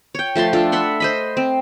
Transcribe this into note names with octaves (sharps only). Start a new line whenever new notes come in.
C#5 G5
F3 A3 A5 C6
D4 F4 A4
E5 F#5 B5 C6
C5 D#5 B5
C4